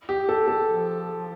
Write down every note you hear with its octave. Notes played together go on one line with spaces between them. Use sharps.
G4
A4
A4
F3